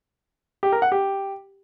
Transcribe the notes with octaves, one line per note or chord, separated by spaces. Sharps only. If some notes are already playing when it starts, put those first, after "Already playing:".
G4
A#4
F#5
G4